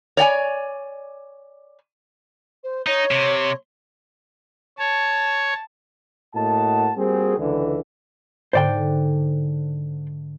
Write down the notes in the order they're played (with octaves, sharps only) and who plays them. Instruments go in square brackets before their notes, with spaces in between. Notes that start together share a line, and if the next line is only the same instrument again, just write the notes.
[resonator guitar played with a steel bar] C#5 D5 G5 G#5
[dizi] C5
[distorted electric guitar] D#4 [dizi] C#5
[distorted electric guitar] C3
[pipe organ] C#5 [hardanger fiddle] A5
[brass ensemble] A2 A#3 F#4 D#5 F#5 A5
G3 A#3 C4 F#4 G#4
C#2 D3 E3
[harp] G#2 D3 [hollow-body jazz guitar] C5 D5 G5